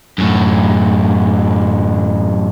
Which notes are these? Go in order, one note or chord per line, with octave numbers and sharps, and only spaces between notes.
F#2 A2